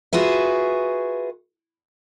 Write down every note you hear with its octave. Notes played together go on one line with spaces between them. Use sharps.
F4 F#4 G#4 B4 E5